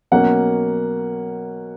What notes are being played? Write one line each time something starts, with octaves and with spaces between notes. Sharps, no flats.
B2 F#3 A#3 C#4 F#5